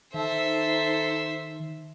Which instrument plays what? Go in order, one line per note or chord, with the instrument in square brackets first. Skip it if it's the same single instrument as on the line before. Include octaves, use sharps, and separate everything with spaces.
[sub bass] D#3 [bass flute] D#4 [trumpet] A4 [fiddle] C5 E5